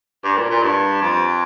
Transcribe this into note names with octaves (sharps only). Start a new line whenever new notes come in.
G2
A#2
A#2
G2
F2